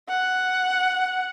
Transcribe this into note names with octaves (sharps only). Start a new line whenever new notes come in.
F#5